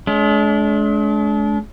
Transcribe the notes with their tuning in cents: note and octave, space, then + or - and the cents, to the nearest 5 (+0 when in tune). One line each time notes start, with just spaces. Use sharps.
G#3 +40 D4 -40